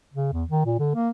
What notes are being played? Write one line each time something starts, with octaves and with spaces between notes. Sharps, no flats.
C#3
E2
D#3
A#2
D3
A#3